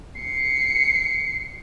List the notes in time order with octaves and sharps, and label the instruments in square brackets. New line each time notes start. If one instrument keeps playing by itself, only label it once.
[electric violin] C7 C#7